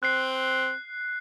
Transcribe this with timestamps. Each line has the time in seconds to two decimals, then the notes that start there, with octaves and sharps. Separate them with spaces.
0.03 C4 F#6 C7